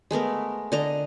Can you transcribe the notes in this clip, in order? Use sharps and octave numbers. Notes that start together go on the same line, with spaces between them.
G#3 A3 B3 A#4
D3 D#5 A#5